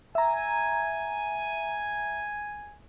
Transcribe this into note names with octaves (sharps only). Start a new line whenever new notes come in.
E5 G#5 A#5